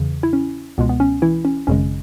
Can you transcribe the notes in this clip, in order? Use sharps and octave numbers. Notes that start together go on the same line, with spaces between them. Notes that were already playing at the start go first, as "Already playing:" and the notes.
Already playing: E2 C#3 E3
E4
C#4
C#2 B2 G#3 B3
B3
C#4
E3 E4
C#4
G#1 F#2 C#3 G#3 C#4